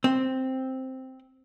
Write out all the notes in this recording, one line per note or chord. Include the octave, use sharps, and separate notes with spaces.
C4